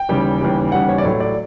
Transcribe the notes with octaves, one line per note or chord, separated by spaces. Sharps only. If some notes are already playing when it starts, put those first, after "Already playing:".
Already playing: G5
D#2 C#3 E3 G3
D#2 C#3 E3 G3
D#2 C#3 E3 G3 F#5
C#5
D5
A2 F#3 C#5
D5